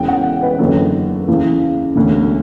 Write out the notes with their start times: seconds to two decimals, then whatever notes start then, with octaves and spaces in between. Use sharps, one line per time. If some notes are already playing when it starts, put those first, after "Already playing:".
Already playing: E1 E2 C#3 G5
0.08 F#5
0.43 B4
0.59 F#1 E2 D3 F#3 B3 A4
1.28 E2 C#3 E3
1.95 E1 D2 D3